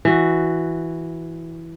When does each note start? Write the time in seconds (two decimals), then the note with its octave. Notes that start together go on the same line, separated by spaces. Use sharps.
0.05 E3 F#4